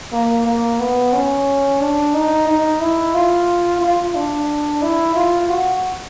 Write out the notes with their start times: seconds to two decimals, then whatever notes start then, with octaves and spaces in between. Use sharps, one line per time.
0.12 A#3
0.46 A#3
0.79 B3
1.13 C#4
1.80 D4
2.14 D#4
2.47 D#4
2.81 E4
3.14 F4
3.81 F4
4.15 D4
4.82 E4
5.15 F4
5.49 F#4